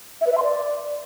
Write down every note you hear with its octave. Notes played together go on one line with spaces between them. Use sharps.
E5
B4
E5
C6
D5